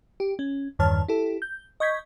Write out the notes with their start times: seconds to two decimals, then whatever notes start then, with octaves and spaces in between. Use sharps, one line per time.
0.20 G4
0.39 C#4
0.79 E2 G2 D#3 C#5 A5 F6
1.08 E4 G4 A4
1.42 G6
1.80 D#5 C#6 G6 G#6 B6